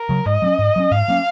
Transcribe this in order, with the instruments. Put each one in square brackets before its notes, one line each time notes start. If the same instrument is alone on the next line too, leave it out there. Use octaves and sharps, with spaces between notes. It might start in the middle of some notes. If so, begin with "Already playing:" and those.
Already playing: [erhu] A#4
[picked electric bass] C#3 F#3
[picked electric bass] G#2 [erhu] D#5
[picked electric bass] F#3 A#3 C#4
G#2
F#3 A#3 C#4
[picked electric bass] G#2 [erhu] F5
[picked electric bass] F#3 A#3 C#4